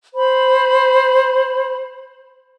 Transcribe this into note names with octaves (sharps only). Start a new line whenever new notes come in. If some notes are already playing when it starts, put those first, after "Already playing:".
C5 B5